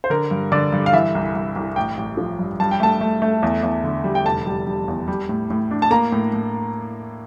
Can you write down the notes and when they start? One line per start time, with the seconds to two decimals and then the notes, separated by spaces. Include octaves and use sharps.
0.04 C5
0.10 D3 A#4
0.31 G2
0.52 D3 D5
0.72 G2
0.86 F5
0.93 E3 E5
1.15 C2
1.35 C2
1.56 C2
1.76 A1 G5
1.97 A1
2.17 F3
2.39 G2
2.60 G2 A5
2.71 G5
2.80 A3 A5
3.01 A3
3.22 A3
3.43 E2
3.63 E2
3.84 D3
4.04 G3
4.15 G5
4.25 F1 A5
4.46 G3
4.67 G3
4.88 E2
5.08 G3
5.29 A2
5.50 A2
5.71 D4
5.82 A5
5.91 A#3 A#5
6.12 A2
6.33 A2